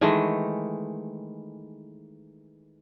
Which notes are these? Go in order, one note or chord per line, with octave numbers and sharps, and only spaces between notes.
D#3 E3 G#3 A3